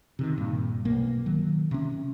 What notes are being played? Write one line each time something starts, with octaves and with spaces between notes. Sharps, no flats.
C3 D#3
G2 A#2
B1 A#3
D#3 F#3
C3 C#4